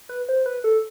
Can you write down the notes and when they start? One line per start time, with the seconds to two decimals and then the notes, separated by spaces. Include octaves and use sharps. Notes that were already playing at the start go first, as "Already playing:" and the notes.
0.09 B4
0.29 C5
0.46 B4
0.64 A4